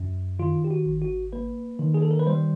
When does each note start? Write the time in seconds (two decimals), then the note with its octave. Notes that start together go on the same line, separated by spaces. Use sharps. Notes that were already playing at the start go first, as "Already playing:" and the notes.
Already playing: F#2
0.39 D#3 F4
0.64 G4
0.71 F#4
0.86 G#1
1.02 F#4
1.33 A#3 B4
1.79 D#3
1.94 G#4
2.02 A4
2.11 A#4
2.19 B4
2.27 G3 C5